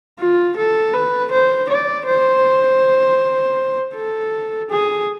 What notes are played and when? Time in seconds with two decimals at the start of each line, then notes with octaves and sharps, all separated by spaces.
0.19 F4
0.56 A4
0.93 B4
1.31 C5
1.69 D5
2.06 C5
3.94 A4
4.70 G#4